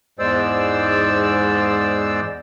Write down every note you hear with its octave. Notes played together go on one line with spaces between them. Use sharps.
E2 G#2 G#3 C5 D5 E6